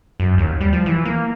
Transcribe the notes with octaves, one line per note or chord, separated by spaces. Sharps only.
F#2
D#2
G3
F3
E3
A#3